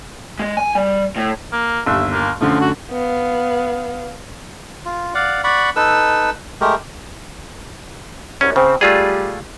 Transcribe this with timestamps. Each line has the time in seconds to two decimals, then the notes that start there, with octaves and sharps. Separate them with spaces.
0.39 G#3
0.57 G#5
0.75 G3
1.17 A2
1.52 A#3
1.86 G1 D#2 E5
2.12 A#3
2.41 F#2 D3 F3 A3
2.61 F#4
2.91 B3 F5
4.85 F4
5.14 D5 F5 F#5
5.44 D5 F#5 B5 C#6
5.76 D#4 A4 B4 E6
6.61 G#3 A3 G4 A#4
8.41 C2 F#2 C#4
8.56 C#3 C4
8.81 G3 A3 F4 G#4